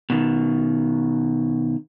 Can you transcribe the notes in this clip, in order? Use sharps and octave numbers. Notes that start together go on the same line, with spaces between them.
B2 D#3